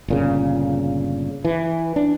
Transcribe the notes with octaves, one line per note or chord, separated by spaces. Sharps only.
G1 A#2 C#3
E3
D4